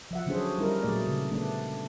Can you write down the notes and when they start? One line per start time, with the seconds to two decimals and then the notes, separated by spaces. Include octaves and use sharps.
0.11 F3 E5 F#5
0.26 D3 F#3 C#4 D4 G#4 C5
0.58 G3 C#4 D#4 E4 A#4
0.83 A#2 F#3 A3 G#4 D5
1.06 C#3
1.31 D3 A3 B3 D4